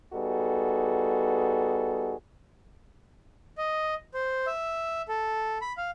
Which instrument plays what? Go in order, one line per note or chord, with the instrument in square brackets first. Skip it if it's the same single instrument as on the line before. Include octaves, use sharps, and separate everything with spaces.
[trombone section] G3 B3 D#4 F#4 G#4 A4
[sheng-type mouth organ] D#5
C5
E5
A4
B5
F5